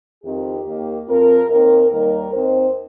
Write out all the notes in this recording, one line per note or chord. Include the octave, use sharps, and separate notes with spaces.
F2 D#3 C4 G4
D#2 D#3 A#3
F2 F3 C4 A#4
D#2 D#3 C4 A#4
D#2 D#3 G3 A#3 A#4
D#2 D#3 C4 C5